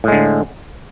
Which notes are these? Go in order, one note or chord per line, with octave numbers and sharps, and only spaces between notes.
A2 D3 G#3